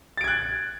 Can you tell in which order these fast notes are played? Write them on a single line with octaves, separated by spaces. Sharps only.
A6 D7 G#6 F#6